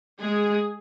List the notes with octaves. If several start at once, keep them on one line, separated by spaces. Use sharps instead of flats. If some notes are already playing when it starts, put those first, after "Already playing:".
G#3 G#4